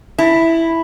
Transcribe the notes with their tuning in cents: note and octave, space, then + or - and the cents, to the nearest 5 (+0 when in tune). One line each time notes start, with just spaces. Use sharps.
E4 +0 A5 +20